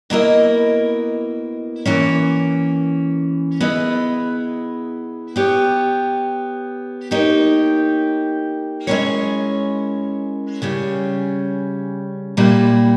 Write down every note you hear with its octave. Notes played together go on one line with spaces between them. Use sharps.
B2 A#3 E4 A#4 D#5
E3 A#3 C#4
B3 E4 G#4 D#5
B3 G4 C#5
A#3 D#4 G4 C#5
G#3 C#4 E4 A#4 C#5
C#3 G3 C#4
A#2 G3 A#3 E4